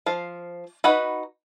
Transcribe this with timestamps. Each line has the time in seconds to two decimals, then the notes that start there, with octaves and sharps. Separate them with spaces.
0.06 F3 F5
0.84 D#4 F#4 B4 F#5 B5